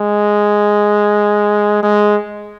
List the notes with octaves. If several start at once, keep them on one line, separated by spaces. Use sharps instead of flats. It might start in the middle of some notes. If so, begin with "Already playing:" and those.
Already playing: G#3
G#3